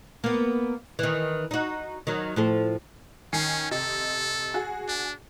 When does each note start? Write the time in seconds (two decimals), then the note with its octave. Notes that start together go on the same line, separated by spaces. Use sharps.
0.24 A#3 B3
0.99 D#3 E3
1.51 D#4 F#4
2.07 D#3 F#3
2.36 A2 F3 A4
3.33 D#3 C#4 G#5 C7
3.71 C3 A4 D#5
4.54 F#4 G#4
4.88 D4